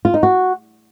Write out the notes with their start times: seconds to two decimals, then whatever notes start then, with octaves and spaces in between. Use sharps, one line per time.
0.05 F4
0.14 D#4
0.23 F#4